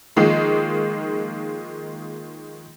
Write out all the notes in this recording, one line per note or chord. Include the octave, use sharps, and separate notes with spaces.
D#3 F3 G#3 A#3